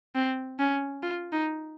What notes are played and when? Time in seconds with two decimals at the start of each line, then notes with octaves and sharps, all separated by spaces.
0.15 C4
0.59 C#4
1.03 F4
1.32 D#4